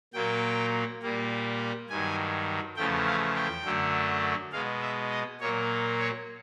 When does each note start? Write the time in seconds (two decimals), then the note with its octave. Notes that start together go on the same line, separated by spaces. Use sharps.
0.14 A#2 F#3 A#3 G5
1.02 A#2 G3 A#3
1.89 G2 D#3 F#3 G#5
2.77 E2 C#3 F3 A3 G5
3.06 F5
3.36 G5
3.64 F#2 D3 F#3 A3
4.52 B2 G#3 F5
4.82 E5
5.11 D#5
5.40 A#2 F#3 A#3 C#5
5.99 C#5